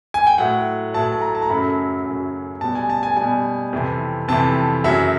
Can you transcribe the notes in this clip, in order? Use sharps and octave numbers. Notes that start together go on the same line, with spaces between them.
G#5
G5
A2 F#3 F#5
A2 F#3 A5
A5
A#5
A5
A#5
F#2 C#3 F#3 B5
F#2 C#3 F#3
B2 G3 A5
G#5
A5
G#5
B2 G3 G#5
F2 C3 E3
F2 C3 E3 A5
F#2 C#3 F#3 E5